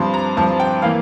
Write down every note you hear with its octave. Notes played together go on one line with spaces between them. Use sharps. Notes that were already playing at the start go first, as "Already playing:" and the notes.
Already playing: G2 F3 C4 C6
A#5
G2 F3 C4 A5
G5
E3 A#3 F5